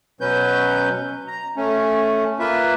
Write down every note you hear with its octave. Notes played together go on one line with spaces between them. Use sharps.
B2 F#3 C#4 B4 G6
A#5
A3 C#4
A#3 F4 B4 E5